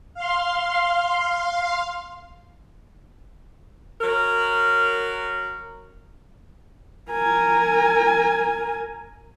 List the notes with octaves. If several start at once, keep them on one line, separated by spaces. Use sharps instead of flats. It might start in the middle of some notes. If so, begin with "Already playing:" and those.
F5 C6
F#3 A#4
A#4 G#5